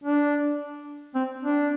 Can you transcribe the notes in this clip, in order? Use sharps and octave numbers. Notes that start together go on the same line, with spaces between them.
D4
C4
D4